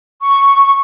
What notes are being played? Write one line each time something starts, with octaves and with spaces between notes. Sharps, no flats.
C#6